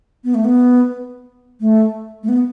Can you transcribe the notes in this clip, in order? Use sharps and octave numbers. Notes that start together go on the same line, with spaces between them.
B3
A3
B3
A3
A3
B3